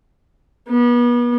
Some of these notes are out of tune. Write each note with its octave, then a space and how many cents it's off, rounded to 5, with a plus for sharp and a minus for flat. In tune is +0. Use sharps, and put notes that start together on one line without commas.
B3 -35